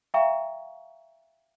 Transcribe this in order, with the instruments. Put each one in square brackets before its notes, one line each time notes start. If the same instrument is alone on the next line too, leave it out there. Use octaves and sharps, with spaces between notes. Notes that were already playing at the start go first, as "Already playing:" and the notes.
[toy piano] E5 F5 G5 A#5 C#6